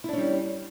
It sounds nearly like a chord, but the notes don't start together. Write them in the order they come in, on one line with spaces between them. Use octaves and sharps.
E4 D4 C#4 G3